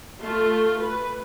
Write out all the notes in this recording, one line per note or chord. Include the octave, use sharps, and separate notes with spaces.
A3 F4
B4